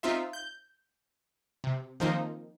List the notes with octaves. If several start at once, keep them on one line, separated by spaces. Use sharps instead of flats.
C4 D#4 F4 E5
G6
C3
D#3 F3 A#3 C4 D#4